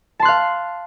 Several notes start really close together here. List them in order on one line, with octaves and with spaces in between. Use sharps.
A5 C6 F#6 F5